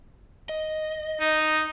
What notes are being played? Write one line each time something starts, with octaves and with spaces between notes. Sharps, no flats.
D#5
D#4